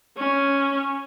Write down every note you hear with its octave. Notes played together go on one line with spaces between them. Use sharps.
C#4